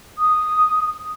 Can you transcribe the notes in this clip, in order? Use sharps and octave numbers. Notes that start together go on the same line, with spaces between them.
D#6